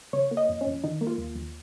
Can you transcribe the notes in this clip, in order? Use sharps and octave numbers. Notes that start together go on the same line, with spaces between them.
C#3 C#5
A#3
D#5
F2
C#4
F2
D#3 D#4
A#3
F4
D#2
D#2